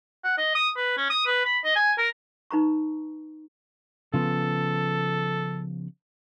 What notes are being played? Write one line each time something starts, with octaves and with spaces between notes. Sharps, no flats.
F#5
D#5
D#6
B4
C#4
D#6
B4
B5
D#5
G#5
A#4
D#4 B4 A#5 C#6
C#3 F3 B3 A4